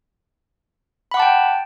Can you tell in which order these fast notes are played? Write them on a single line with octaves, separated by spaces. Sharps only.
B5 F#5 D6 A5 G5